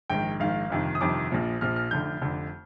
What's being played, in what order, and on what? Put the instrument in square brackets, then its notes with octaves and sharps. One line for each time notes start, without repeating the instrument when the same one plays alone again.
[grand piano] A#1 G#2 D#3 G5
A#1 G#2 D#3 F5
G1 F2 C3 D#3
D#6
G1 F2 C3 D#3 D6
A#1 A#2 F3
A#1 A#2 F3 F6
F6
F1 F2 D3 G6
F1 F2 D3